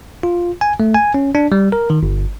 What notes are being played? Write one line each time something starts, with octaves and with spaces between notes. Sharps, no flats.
F4
G#5
A3
G#5
C#4
D4
G3
A#4
D#3
G1